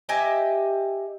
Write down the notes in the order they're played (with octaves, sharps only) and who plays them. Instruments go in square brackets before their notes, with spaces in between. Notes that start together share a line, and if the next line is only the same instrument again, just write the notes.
[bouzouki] G4 D#5 E5 G#5